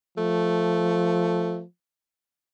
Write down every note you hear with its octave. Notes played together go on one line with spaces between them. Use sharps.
F3 A3